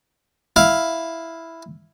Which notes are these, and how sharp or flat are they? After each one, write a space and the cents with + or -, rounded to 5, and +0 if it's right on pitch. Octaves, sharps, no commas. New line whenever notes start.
E4 +0 F5 +0